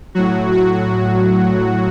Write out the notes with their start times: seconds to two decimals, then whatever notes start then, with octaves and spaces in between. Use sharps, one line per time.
0.15 A2 F#3 F#4
0.52 F#4